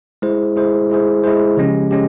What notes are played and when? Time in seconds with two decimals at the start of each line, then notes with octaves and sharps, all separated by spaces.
0.22 G#3 E4 G#4 C5
0.56 G#3 E4 G#4 C5
0.90 G#3 E4 G#4 C5
1.24 G#3 E4 G#4 C5
1.57 C#3 F3 G#3 C#4 G4
1.91 G#3 C#4 G4